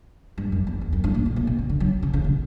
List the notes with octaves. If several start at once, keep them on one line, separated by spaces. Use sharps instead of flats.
G2
F#2
E2
E2
F#2
G2
A#2
B2
A#2
B2
C#3
D3
F#3
C#3
C#3
B2